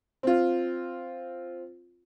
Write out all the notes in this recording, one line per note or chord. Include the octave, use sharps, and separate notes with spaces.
C4 F4